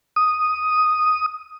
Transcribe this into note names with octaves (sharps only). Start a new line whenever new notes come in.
D#6